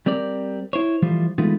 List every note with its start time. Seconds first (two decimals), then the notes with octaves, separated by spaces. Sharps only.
0.06 G3 C4 A#4 D5
0.73 E4 C5 C#5
1.02 E3 F3 G3 A3 F4 C5
1.38 E3 G#3 A3 B3 D#4 F4